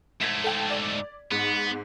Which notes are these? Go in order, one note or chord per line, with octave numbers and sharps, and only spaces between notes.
G#2 A3 G#6 B6 E7
A4 G5
D5
G#2 B3